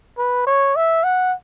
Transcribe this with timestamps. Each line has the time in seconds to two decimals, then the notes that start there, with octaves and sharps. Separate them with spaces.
0.18 B4
0.47 C#5
0.76 E5
1.04 F#5